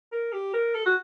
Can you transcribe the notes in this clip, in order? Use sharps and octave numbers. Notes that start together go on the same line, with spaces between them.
A#4
G4
A#4
A4
F#4